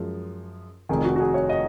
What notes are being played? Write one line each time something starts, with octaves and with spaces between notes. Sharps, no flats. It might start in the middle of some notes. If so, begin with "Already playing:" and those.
Already playing: F#2 F3 G#3
F1 F2 D#3 G#4
F#4
F#4
G#4
C#5
D#5